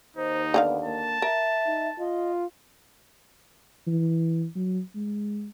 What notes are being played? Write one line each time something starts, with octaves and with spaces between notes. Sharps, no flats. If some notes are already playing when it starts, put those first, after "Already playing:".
D#2 D#4 C5
D3 B3 G4 F5
A#3 A5
A#4 E5
D#4
F4 D#5
E3
F#3
G#3